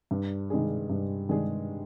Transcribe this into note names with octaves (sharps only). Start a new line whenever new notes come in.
G2
D#3 G#3 D4 G#4
G2
D#3 G#3 D4 G#4